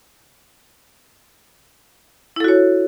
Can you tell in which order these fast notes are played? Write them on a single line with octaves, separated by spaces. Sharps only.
E4 A4 F#4 C#5